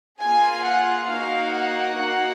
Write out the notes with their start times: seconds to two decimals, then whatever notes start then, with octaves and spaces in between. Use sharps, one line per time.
0.21 A#3 F4 G#4 G#5
0.64 F#5
1.08 A#3 D#4 F#4 F5
1.52 F#5
1.96 A#3 D#4 F#4